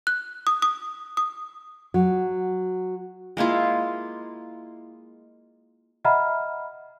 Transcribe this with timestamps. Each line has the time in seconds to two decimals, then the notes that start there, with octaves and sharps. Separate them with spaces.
0.07 F#6
0.47 D#6
0.62 D#6
1.17 D#6
1.94 F#3
3.37 G#3 A#3 E4 F4
6.05 D#5 E5 F#5 A#5 B5 F6